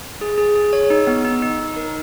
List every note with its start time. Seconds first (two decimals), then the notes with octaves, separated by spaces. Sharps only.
0.21 G#4
0.38 G#4
0.56 G#4
0.73 C#5
0.90 D#4
1.07 B3
1.25 D#4
1.42 D#4
1.60 D#4
1.76 A#4